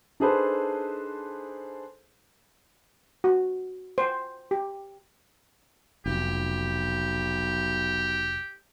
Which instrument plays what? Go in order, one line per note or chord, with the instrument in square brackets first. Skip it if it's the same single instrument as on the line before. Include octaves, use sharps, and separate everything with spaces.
[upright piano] D4 D#4 G#4 A4 B4 C5
[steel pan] F#4
C5
G4
[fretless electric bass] F1 [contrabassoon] B1 [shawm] G4